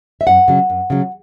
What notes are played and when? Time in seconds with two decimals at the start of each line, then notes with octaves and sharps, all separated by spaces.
0.21 E5
0.27 F#2 F#5
0.48 C#3 F#3
0.70 F#2
0.90 C#3 F#3